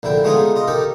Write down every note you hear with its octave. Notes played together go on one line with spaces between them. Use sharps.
A#1 D3 E4 G5
G#3 A3 B3 D#4 F4 G#4
F4 D#5
D#4 G4 A4 A#4